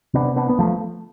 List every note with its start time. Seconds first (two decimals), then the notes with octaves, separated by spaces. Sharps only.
0.14 C3 B3 D4
0.36 B3 D4
0.49 B3
0.59 F3 A3